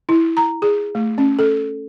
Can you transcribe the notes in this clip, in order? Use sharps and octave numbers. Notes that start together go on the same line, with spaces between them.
E4
A#5
G#4
A3
C#4
A4